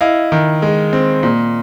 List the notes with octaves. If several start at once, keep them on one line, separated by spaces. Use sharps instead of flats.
E4 D#5 F5
D#3
G#3
C4
A#2